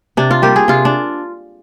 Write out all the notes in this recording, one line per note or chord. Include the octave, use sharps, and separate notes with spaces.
C3 D4
F4
G3 A#3 G4
G#4
C3 F4
D4